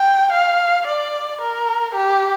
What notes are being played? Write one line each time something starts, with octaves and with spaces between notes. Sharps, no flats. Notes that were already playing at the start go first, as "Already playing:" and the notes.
Already playing: G5
F5
D5
A#4
G4